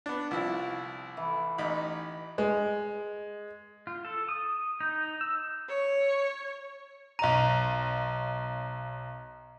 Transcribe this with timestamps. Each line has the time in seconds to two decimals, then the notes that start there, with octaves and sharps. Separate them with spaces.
0.06 B3 D4
0.31 C2 F3 E4
1.17 E3
1.58 A1 D#4 B5
2.38 G#3
3.87 F4
4.05 A4
4.29 D#6
4.80 D#4
5.21 E6
5.69 C#5
7.19 B1 D#5 A#5 D#7